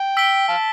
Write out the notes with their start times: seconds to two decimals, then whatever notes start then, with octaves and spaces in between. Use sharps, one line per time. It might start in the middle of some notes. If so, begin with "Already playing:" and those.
Already playing: G5
0.17 E6 B6 D7 G7
0.49 F5 A5